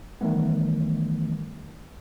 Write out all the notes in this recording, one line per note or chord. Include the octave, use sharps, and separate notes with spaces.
D#3 E3 G3 A3 B3